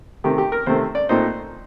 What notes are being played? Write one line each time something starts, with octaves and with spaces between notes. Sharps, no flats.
C3 D#3 A3 G4
G4
A#4
C3 D#3 A3 C5
D5
A#2 A3 C4 D#4 C5